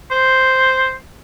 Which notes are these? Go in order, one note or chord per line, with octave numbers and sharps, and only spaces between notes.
C5